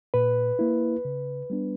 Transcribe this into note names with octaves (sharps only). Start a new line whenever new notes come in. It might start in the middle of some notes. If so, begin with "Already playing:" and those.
A#2 B4
A#3 E4
C#3
G3 B3 D4